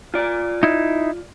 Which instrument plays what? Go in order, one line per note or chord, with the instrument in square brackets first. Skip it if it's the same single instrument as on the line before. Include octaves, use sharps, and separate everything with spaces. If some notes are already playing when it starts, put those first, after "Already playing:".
[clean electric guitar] F4 D5
[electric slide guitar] D#4 E4